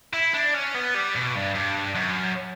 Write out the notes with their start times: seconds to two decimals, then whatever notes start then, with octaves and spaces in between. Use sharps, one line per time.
0.14 E4
0.34 D4
0.54 C#4
0.75 B3
0.95 G3
1.16 B2
1.35 G2
1.55 G2
1.96 F#2